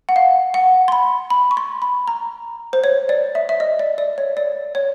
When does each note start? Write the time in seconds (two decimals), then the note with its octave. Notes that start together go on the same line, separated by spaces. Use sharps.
0.09 F#5
0.16 F5
0.54 F#5
0.88 C6
0.92 B5
1.30 B5
1.51 C#6
1.57 C6
1.82 B5
2.08 A#5
2.73 C5
2.84 C#5
3.09 D5
3.35 E5
3.49 E5
3.60 D#5
3.79 D5
3.98 D5
4.18 C#5
4.37 D5
4.75 C#5